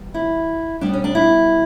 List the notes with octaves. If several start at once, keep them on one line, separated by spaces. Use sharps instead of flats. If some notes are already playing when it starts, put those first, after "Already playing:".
Already playing: E2 B2 G3
E4
B2 G3 B3 D4
C#4
D4
E4